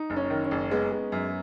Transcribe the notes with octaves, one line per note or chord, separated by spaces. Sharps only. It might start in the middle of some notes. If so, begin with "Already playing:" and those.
Already playing: D#4
F#1
C#4
D#3
C#4
F#1
G#3 B3
G#3
F#2